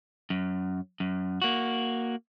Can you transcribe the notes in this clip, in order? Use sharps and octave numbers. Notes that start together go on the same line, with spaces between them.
F#2
F#2
A#3 F#4